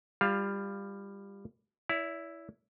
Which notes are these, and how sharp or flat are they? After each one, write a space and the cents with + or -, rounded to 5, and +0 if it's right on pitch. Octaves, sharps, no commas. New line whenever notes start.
G3 +20 F4 +0 F5 +0
E4 +0 D5 -45